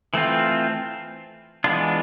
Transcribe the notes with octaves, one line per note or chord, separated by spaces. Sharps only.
E3 A3 C4 F4
E3 G#3 B3 D4 F4